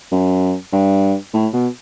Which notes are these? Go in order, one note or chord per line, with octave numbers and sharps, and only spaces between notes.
F#2
G2
A2
B2